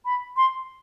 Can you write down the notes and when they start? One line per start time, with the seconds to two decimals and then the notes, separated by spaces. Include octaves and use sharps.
0.05 B5
0.37 C6